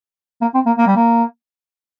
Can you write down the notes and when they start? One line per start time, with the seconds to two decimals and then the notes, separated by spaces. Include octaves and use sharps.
0.41 A#3
0.54 C4
0.67 A#3
0.78 A#3
0.87 G3
0.96 A#3